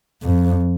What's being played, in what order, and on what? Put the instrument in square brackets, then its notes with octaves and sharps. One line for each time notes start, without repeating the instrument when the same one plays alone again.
[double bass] F2